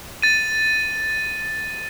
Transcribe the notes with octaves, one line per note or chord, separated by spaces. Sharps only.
A6 D#7